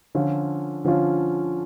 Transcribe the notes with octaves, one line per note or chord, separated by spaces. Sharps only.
D3 F3 C#4 F4
D3 F3 C#4 F4